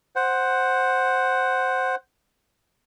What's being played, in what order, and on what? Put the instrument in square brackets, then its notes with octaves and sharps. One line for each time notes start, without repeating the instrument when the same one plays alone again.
[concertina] C5 F#5